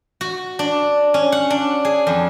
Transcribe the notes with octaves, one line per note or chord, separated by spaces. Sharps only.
F#4
D4
C#4
F#5
D4
G#4
F2